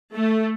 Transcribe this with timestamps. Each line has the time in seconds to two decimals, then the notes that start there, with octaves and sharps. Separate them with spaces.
0.15 A3